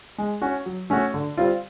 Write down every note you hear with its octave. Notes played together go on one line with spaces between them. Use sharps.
G#3
C#4 F#4
F#3
A3 C#4 F#4
D3
G3 C4 F4